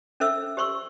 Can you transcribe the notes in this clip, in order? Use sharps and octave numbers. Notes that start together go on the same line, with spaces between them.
C#4 A4 C5 E5 E6
G4 C5 C6 C#6 E6